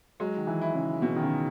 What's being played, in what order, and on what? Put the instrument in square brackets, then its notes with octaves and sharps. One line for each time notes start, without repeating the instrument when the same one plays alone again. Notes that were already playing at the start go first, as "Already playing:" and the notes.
[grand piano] F#3 [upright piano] G#3
[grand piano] D#3
E3
[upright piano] E4
[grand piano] C#3
[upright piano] B2
[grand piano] D#3
C#3